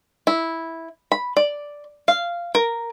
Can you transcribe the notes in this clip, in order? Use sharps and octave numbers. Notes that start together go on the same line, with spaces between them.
E4
B5
D5
F5
A#4